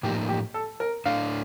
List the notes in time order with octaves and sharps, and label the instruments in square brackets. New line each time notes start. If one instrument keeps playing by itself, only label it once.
[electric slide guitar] A2 F3 A#3 D#4 [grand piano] G4
[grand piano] G4
A4
A#4
[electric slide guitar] A2 A3 D4 [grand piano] F5